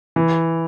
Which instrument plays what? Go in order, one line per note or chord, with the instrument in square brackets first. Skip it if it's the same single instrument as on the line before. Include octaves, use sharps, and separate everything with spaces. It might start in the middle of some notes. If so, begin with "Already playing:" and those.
[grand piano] E3